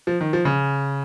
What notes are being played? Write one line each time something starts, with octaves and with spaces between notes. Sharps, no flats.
F3
D#3
F3
C#3